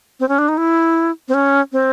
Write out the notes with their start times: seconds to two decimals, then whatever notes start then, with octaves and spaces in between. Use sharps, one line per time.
0.20 C4
0.28 C#4
0.38 D4
0.48 D#4
0.57 E4
1.28 C4
1.34 C#4
1.72 C4